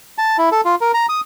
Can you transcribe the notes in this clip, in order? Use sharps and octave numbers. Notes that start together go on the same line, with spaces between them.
A5
E4
A4
F4
A#4
A#5
D#6